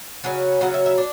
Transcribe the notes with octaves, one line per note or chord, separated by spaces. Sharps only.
C#3 F#3 C#4
C#3 F#3 C#4 F#5
E5
E5
D4